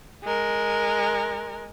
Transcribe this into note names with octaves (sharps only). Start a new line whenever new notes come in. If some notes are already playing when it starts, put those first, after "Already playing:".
G#3 A#4